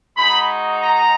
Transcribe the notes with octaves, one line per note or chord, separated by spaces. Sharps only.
G#3 D#4 F#4 B5
A#5